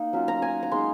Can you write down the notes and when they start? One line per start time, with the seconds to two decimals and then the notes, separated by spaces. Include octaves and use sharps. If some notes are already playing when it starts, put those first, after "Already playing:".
Already playing: A#3 D#4
0.13 F#3 C#4 F4
0.28 A#5
0.42 G#5
0.63 A#5
0.71 G#3 D#4 C6